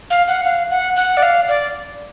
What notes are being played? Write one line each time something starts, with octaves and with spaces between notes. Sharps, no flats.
F5
F#5
F5
F#5
F#5
D5
F5
D5